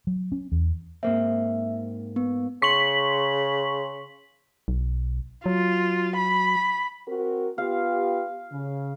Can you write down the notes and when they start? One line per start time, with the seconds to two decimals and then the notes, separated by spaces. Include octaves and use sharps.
0.07 F#3
0.32 C#4
0.52 E2
1.03 G#2 A#3 C4 E5
2.16 B3
2.62 C#3 C6 C#6 B6 F#7
4.68 B1
5.46 F#3 F4
6.16 B5
7.08 C4 F#4 A#4
7.58 B3 F4 G4 F5
8.52 C#3